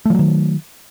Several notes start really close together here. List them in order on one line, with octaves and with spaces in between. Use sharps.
A3 F3 F#3 D#3